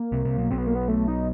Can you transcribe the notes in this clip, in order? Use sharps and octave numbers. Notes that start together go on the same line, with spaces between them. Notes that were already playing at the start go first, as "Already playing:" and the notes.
Already playing: A#3
C2 C3
C2 C3
B1 B2
B1 B2 C4
B3
A#3
B3
A3
D#4